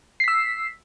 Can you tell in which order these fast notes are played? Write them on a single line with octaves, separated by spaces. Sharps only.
C7 B6 E6